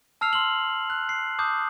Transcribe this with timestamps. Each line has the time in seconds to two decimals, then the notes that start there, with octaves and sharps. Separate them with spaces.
0.21 A5 E6 F6 C7 F7
0.33 C6 F#7
0.90 F#6
1.09 C7
1.39 A5 D6 D#6 G6